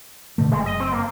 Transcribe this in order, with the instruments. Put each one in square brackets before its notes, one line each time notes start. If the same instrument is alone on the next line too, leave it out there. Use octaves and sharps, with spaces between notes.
[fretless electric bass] B2 D3 A3
[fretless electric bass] F#1 [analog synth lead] G#3
[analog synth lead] D#5
C4
A#3